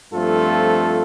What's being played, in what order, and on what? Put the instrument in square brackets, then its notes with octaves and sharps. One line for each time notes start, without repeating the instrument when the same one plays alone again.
[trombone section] G2 F3 A3 C4 F4 A4